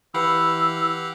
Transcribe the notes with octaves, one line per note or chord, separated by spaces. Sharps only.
E3 G4 B4 F5 F#5 B5 E6